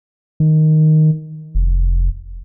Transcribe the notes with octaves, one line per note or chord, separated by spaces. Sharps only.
D#3
F1